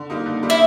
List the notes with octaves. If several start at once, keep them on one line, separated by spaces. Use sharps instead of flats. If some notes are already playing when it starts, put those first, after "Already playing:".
Already playing: D3
G3 A#3 D#4
D3
G3 A#3 D#4
E4